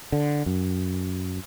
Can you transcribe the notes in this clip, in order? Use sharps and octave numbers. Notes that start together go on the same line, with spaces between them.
D3
F#2